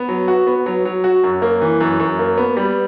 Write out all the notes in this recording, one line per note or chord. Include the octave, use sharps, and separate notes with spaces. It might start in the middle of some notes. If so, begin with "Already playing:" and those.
Already playing: B3
F#3
F#4
B3
F#3
F#3
F#4
F#2
A#3
E3
F#2
F#2
A#3
B3
G3